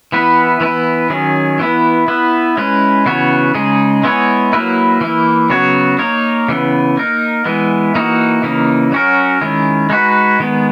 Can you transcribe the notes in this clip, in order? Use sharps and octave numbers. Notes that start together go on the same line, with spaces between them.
E3 B3 E4 B4
E3 B3 E4 B4
D#3 F#3 C#4 G#4
E3 B3 E4
B3 E4 B4
G#3 C#4 E4 B4
C#3 E3 B3 F#4 C#5
C#3 G#3 D#4 G#4
G#3 B3 E4 G#4 C#5
F#3 A#3 E4 B4
E3 A#3 E4
C#3 F#3 B3 F#4 C#5
A#3 D#4 A#4 C#5
C#3 E3 B3
A#3 D#4 A#4
E3 G#3 B3
E3 A#3 D#4 F#4
C#3 E3 A#3 D#4
F#3 C#4 F#4 A#4
D#3 G#3 C#4 E4
G#3 D#4 F#4 B4
D#3 G#3 B3